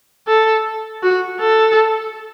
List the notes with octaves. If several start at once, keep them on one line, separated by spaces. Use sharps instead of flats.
A4
F#4
A4